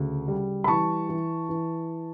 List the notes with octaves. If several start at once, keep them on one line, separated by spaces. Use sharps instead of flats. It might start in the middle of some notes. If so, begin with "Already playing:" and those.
Already playing: D2 C#3
G3
B5
E3 A5 C#6
E3
E3